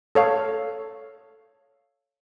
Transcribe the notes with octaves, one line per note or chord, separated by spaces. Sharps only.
A4 C#5 F5